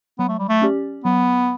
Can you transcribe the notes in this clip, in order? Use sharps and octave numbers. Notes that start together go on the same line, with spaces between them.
F#3 B3
A3
G3
A3
C#4 G4 D5
F#3 B3